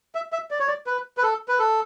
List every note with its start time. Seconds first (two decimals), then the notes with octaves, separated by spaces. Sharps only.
0.15 E5
0.32 E5
0.51 D5
0.59 C#5
0.67 D5
0.87 B4
1.17 B4
1.23 A4
1.48 B4
1.59 A4